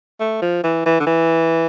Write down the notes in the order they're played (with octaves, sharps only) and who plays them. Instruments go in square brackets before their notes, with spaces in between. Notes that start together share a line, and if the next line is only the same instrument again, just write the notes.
[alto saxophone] A3
F3
E3
E3
D3
E3